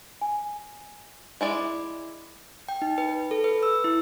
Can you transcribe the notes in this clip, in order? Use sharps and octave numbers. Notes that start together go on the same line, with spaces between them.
G#5
G#3 E4 D5
G5
D#4
B4
A4
B4
E6
E4